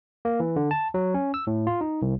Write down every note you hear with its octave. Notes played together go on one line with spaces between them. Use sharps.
A#3
E3
D3
A5
F#3
C#4
E6
A2
F4
D#4
C2